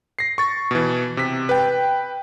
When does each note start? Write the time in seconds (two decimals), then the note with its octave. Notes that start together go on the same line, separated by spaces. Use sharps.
0.19 A#6 C7
0.38 C#6 A6
0.71 B2 E3
1.17 C3 B6
1.49 B4 G5